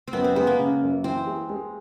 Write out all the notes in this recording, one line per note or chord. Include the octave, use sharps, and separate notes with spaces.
C4
F#2 B3
C4
G#3 B3
A#3
C#3
F#2
E3 C4
G#3
G#3